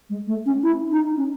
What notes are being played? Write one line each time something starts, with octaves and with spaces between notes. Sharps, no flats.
G#3
A3
C#4
E4
D#4
C#4